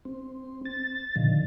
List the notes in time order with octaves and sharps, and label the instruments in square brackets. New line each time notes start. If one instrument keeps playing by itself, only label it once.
[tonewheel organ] C4
A6
A#2 D3 D#3 F3